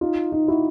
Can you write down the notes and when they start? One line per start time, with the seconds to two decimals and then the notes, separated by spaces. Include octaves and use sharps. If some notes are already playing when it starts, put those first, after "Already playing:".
0.01 D#4 F4
0.32 D#4 F4
0.48 E4 F#4